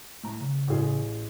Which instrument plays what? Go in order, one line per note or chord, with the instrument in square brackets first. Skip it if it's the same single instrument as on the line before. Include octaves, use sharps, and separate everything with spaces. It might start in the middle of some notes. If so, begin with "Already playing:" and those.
[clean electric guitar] A2 A#5
C#3
[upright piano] A1 G#4